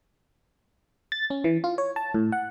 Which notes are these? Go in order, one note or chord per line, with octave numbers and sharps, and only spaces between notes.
A6
C#4
E3
F4
C#5
A5
A2
F#5